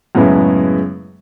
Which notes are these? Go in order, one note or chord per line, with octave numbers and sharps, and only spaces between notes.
F#2 A2 C#3 G#3 B3 E4